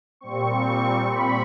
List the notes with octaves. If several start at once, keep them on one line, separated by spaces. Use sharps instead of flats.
A#2 G3 C4 C#6
B5